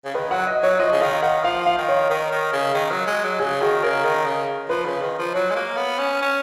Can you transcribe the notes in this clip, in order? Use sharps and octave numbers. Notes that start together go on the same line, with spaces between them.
C#3
D#3 B4
F#3 F#5
D#5
F#3 C#5
F3 D#5
C#3
D#3 F5
D#3 F#5
F3 F5
F5
D#3
C#5
D#3 A#4
D#3
C#3
D#3
F#3
G#3
F#3
C#3 G#4
D#3 F#4
C#3 A#4
D#3
C#3
F3 B4
C#3
D#3
F3
F#3 C#5
G#3
A#3
B3
C#4
C#4